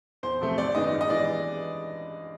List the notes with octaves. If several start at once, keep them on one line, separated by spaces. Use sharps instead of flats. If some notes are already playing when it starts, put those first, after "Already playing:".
E2 C5
C3 F3 A3
G#1 D5
F#2 D#3 G#3 B3 D#5
G2
D#5
E3 G#3 B3 D5